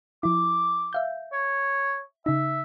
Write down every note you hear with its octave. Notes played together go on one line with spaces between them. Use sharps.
F3 E4 D6
E5 F5 G6
C#5
C#3 D#4 E5